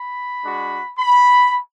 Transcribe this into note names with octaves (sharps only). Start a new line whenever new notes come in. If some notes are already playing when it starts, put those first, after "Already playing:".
Already playing: B5
G#3 D4 F#4
B5